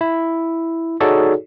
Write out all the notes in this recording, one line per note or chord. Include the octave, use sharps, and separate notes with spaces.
E4
D#4 F#4 G#4 A4 C#5 D5